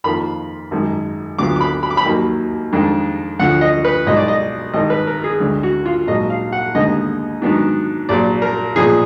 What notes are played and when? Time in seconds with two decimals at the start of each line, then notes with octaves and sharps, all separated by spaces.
0.04 F2 D#3 A#3 F4 B5
0.71 G#1 F#2 D#3 G#3
1.39 D2 D3 F#3 B3 F4 D6
1.56 D6
1.61 B5
1.83 B5
1.90 D6
1.97 B5
2.06 D#2 D#3 F#3 A#3
2.73 F2 D#3 G#3 D4
3.39 D2 D3 F3 F#5
3.61 D#5
3.85 B4
4.06 B1 B2 G#3 D#4 D#5
4.17 D5
4.28 D#5
4.73 G#1 G#2 D#3 D#5
4.90 B4
5.07 A#4
5.24 G#4
5.40 D2 D3 G#3
5.63 F#4
5.86 F4
6.07 A#1 G#2 F#3 D#5
6.30 F5
6.52 F#5
6.75 D#2 D3 G#3 B3 D#4 D#5
7.42 G#2 D#3 F#3 B3 D4
8.09 A#1 A#2 F#3 D5
8.42 A#4
8.76 B1 A#2 F3 G#4